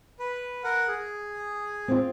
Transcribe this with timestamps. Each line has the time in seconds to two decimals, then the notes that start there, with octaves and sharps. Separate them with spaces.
0.20 B4
0.64 A#4 F#5
0.88 G#4
1.88 C4 F4